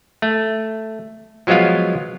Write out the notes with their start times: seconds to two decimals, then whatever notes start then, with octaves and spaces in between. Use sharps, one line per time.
0.22 A3
1.47 F3 F#3 G#3 B3 F4 F5